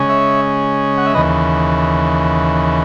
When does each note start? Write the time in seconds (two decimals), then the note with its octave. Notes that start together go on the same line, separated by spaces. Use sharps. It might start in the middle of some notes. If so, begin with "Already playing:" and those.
Already playing: C#3 G#3 C#4
0.09 C#5 E5
0.98 F#5
1.06 E5
1.14 D#2 C#3 E3 B4 D#5